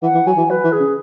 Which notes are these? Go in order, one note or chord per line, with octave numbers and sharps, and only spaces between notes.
E3 F#5
E3
F#3 G#5
E3
F#3 B4
E3
G#4
C#3